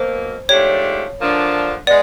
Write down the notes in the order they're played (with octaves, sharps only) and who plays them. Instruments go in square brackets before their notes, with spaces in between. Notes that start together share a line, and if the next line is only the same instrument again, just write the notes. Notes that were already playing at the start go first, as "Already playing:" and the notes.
Already playing: [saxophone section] B2 F#3 A#3 [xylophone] C5
[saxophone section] G#2 F3 A3 D4 G4 [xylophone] C#5
[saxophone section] D3 F3 A#3 D4
[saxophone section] G#3 B3 [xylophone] D5